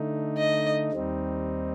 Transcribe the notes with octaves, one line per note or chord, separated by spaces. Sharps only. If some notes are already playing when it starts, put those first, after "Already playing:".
Already playing: D3 A3 D#4
D#5
D#2 D#3 G3 C4 D#4